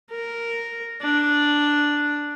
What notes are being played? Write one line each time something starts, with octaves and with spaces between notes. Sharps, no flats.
A#4
D4